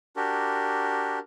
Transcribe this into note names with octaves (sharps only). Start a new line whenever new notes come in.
D4 F#4 G4 A#4